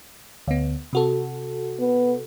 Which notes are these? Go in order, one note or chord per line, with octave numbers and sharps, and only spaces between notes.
D2 B3
C3 F#4 A4
B3